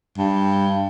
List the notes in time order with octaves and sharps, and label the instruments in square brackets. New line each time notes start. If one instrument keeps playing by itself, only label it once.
[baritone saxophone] G2